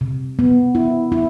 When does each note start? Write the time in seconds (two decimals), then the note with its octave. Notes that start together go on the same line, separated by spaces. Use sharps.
0.01 C3
0.39 B3
0.75 E4
1.12 E4